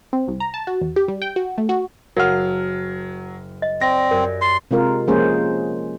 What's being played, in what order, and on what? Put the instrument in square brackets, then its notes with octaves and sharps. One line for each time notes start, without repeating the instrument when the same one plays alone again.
[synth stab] C4
C2
A#5
A5
F#4
E2
G4
G3
G5
F#4
A3
F#4
[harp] F#1 [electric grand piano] F#3 F6 [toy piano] A#4 F5 F#5
[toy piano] D#5
[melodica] C4 [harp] D5 [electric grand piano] A#6
[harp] F#2 G4 G#6 [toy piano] A#4
[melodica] C6 [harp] A6
[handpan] C3 G#3 F4 A#4
F3 G#3 A#3 C#4 G#4 C5